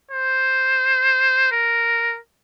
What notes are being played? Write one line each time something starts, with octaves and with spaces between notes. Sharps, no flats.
C5
A#4